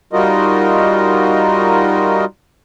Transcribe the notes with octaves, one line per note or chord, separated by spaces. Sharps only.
G3 D#4 F4 F#4 A#4 D#5